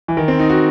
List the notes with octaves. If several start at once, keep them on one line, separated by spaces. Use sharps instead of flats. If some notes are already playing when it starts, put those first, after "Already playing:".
E3
D#3
C4
D#4
F#4